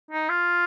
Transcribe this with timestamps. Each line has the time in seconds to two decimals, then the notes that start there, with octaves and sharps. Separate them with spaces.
0.11 D#4
0.29 F4